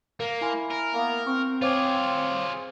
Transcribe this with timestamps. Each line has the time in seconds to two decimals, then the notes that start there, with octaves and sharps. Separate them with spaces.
0.20 A#3 A#4
0.41 E4 G#5 C6
0.70 A#4
0.94 A#3 B3
1.27 C4 C#6
1.62 F4 G#4 C5 C#5 D6